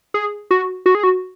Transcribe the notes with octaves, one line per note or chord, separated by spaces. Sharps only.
G#4
F#4
F#4
G#4
F#4